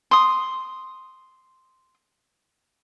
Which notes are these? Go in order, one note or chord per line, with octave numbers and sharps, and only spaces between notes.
C6 D#6